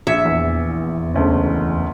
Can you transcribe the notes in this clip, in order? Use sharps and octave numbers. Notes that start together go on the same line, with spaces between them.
A#1 E5 G#6 C#7
E2
F#1 D2 C#4